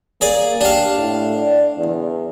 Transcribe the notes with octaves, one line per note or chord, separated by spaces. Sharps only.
A#3 G#4 D5
D4 G4 F5
A2
D5
E2